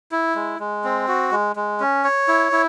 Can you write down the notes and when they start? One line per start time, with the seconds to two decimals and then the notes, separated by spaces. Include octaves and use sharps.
0.12 E4
0.35 G#3
0.60 G#3
0.84 C4
1.08 F#4
1.32 G#3
1.56 G#3
1.80 C#4
2.04 C#5
2.28 E4
2.52 E4